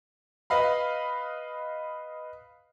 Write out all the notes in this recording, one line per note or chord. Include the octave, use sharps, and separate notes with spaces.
B4 D#5 F5 B5